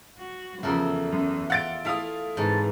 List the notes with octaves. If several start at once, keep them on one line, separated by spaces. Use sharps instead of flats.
F#4
E2 C#3 F3 F#4 A4 A#4 E5
F#2
F4 F#5 A6 D7
A3 E4 F5 D#6
G#2 C3 E3 A5